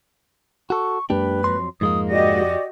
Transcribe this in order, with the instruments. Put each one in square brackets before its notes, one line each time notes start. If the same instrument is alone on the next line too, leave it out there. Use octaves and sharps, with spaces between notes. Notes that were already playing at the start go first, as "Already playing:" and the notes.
[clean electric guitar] F#4 A4 [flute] C#6
[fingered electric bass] F#2 G#3 A#3 [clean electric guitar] D4 G4 [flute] B4
[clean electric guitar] F2 F#3 C6
[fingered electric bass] F2 F3 [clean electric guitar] G#2 G#3 A#3 [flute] D#6
[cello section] F#4 G4 D#5 [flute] D5